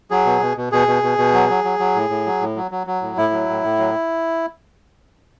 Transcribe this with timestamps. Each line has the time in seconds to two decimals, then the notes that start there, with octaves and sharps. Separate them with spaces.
0.11 F#3 G#4
0.26 B2
0.42 B2
0.57 B2
0.72 B2 G#4
0.88 B2
1.03 B2
1.18 B2
1.34 F#3
1.49 F#3
1.64 F#3
1.79 F#3
1.96 A2
2.10 A2
2.26 F#3
2.41 A2
2.56 F#3
2.71 F#3
2.87 F#3
3.02 A2
3.17 A2 E4
3.33 F#3
3.49 A2
3.64 A2
3.79 F#3